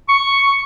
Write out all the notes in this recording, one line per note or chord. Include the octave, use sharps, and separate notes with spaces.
C#6